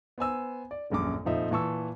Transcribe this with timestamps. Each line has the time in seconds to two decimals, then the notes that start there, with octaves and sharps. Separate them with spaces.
0.18 B3 C5 G#5 E6
0.71 D5
0.90 D#1 A#1 F#2 D6
1.25 F1 A#2 F3 D#4 E5
1.51 A#2 E3 A5 C#6 E6